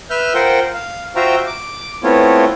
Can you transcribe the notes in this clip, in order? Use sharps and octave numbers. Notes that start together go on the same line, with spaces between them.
B4 E5 F6 G6
F4 A#4 C5 F#5 G5
F5
F4 F#4 C5 E5 G5 A#5
D6
A3 B3 C4 E4 F4 C#5